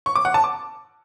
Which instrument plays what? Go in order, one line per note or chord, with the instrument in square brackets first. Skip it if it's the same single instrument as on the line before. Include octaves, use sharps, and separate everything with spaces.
[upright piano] C#6
D6
F#5
A5
D6